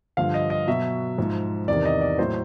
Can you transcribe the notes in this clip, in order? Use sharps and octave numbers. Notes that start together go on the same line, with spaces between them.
G2 D3 F3 F5
D#5
D#5
B2 F#3 E5
G#2 F3
E2 C3 D#3 D5
D#5
D5
A2 F#3 C5